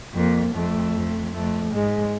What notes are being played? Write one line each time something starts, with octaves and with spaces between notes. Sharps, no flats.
F2 A#3
F2 A3
F2
F2 A3
G#2 G#3